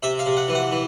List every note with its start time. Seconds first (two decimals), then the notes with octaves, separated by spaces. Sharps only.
0.03 C3 E5
0.19 F5
0.26 C3
0.37 F#5
0.48 E3
0.55 F#5
0.71 E3